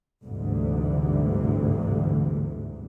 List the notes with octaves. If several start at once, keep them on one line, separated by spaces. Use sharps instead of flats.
G1 D2 G#2 C3 E3